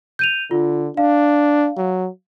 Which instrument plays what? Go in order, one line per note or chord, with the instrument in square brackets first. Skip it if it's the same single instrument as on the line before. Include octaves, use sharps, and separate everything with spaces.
[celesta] G6 D#7 F7
[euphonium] D3 [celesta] F4
[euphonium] D4 [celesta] F5
[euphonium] F#3